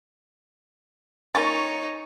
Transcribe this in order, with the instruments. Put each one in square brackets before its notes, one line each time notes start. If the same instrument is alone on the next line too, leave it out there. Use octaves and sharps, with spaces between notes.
[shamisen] A#3 C#4 F4 [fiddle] D#4 C#5 [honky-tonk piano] C#6 A6